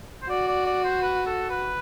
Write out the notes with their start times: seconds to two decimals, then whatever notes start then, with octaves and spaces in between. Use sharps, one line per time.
0.22 C5
0.29 F#4 D5
0.48 D5
0.66 D5
0.84 C5
1.02 B4
1.26 A4
1.50 B4